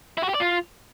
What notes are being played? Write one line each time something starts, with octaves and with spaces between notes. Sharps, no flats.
E4
F#4
G4
D5
F4